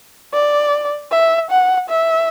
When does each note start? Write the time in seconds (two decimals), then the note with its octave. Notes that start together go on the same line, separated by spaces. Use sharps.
0.33 D5
1.11 E5
1.50 F#5
1.89 E5